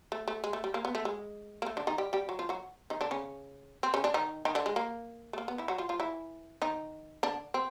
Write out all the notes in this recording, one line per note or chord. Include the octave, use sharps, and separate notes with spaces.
A3
A3
G#3
A3
G3
A#3
B3
A3
G#3
A#3
A3
D3 D4
D#3 D#4
G3 G4
G3 G4
F#3 F#4
F3 F4
F#3 F#4
D#3 D#4
D3 D4
C#3 C#4
C4
C#3 C#4
D3 D4
D#3 D#4
D#3 D#4
D3 D4
G#3
A#3
A3
A#3
B3
E3 E4
F#3 F#4
F3 F4
F3 F4
E3 E4
D#3 D#4
D3 D4
C4